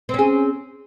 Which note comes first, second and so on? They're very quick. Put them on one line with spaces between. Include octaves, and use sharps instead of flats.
C4 C#4 G#4